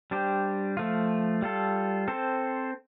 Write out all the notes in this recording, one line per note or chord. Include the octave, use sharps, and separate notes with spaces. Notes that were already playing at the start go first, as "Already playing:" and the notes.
G3 D4 G4 C5
F3 A3 F4
G3 F4 A4
C4 A4 C5